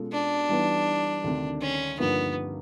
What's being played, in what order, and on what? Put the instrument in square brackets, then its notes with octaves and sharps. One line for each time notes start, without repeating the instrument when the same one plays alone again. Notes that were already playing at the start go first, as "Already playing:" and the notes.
Already playing: [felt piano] B2 G#3 C#4 F4 A4
[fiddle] D4
[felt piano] E3 G3 B3 D#4
D2 C3 D#3
[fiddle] C#4
[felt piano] G2 D3 F3 A#3 D#4 [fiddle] B3